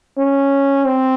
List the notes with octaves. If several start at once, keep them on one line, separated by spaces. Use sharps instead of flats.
C#4
C4